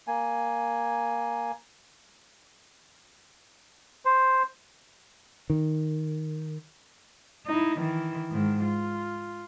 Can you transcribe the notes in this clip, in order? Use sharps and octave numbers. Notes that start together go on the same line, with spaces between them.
A#3 G#5
C5
D#3
D#4 E4
D#3 E3
G#2 D#3
F4